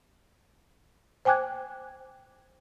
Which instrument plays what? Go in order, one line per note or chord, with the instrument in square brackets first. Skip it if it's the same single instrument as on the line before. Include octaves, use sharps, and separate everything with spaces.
[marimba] C5 G5 G#5 D6 F#6 G#6